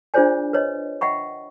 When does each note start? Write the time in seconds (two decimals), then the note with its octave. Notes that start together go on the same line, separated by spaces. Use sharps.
0.14 D4 F4 G#4 C5 D5 G#5
0.53 B4 C#5 D#5
1.01 D#5 E5 F#5 G5 B5 C#6